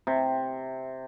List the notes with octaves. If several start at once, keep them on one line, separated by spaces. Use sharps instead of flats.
C3